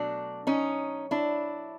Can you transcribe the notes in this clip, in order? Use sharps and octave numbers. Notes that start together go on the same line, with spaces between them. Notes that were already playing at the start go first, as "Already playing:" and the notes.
Already playing: B2 F#3 A3 D4
C#4 D#4
D4 E4